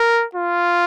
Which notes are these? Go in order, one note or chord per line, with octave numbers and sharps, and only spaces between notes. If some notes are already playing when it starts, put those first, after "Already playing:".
Already playing: A#4
F4